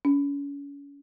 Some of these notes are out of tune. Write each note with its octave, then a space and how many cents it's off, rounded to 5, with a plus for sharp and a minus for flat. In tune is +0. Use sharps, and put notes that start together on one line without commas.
C#4 +35